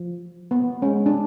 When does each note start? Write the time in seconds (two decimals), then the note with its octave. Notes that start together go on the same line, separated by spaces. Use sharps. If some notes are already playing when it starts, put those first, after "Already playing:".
Already playing: F3
0.51 B3
0.82 G#3 C#4
1.06 D4